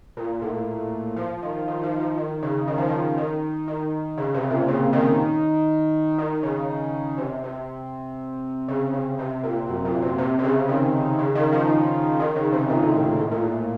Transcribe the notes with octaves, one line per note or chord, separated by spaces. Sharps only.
A#2
A2
F3
D#3
D#3
F3
F3
D#3
C#3
D#3
F3
D#3
D#3
D#3
C#3
C3
A#2
C#3
D#3
D#3
C#3
C3
C3
C#3
C#3
C3
A#2
F#2
A#2
C3
C3
C3
C#3
D#3
C#3
D#3
F3
D#3
C#3
C3
A#2
A2
A#2
A2
A#2
A2